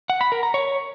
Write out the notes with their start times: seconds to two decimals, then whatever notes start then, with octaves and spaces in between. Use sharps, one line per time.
0.10 F#5
0.21 B5
0.32 A#4
0.43 A#5
0.54 C#5